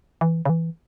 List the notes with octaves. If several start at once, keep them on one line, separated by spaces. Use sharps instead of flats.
E3
C#3
E3